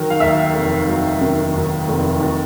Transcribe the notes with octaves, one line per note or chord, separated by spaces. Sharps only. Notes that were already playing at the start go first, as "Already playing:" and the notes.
Already playing: D#3 F#3
F5
D#2 E5
F1
F#3
D#3
D#2
F1
D#2